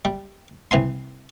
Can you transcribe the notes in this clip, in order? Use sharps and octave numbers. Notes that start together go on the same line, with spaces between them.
G3
C2 E3 G#5 C6